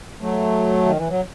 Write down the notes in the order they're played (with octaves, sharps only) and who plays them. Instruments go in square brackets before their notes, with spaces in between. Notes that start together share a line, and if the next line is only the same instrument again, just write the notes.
[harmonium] F#3 A3
D#3
E3
F#3